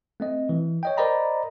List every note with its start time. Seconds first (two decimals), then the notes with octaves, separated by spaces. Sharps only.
0.20 A3 C4 D#5
0.49 E3
0.83 C#5 D#5 G5
0.97 A#4 C5 D5 D#5 A#5 B5